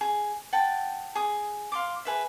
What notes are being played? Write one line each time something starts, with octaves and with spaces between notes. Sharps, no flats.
G#4
F#5 G5 A5
G#4 D#6
F5 C6 D6
G#4 B4 E5